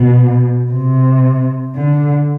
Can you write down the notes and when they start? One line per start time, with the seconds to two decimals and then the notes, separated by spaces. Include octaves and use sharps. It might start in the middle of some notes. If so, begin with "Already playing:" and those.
Already playing: B2
0.72 C3
1.76 D3